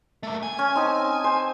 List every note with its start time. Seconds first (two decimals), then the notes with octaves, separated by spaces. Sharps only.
0.23 A3 A#3
0.43 G#5
0.59 C#4
0.75 C4 D#4 A5
1.24 C5